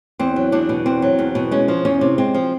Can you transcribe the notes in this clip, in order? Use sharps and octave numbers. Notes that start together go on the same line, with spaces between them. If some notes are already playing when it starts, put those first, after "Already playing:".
E2 C4
F#3
E2 D4
B2
E2 C4
F#3
E2
B2
G#3 C#4
F3
E2 C#4
C3
G#3 C4
F3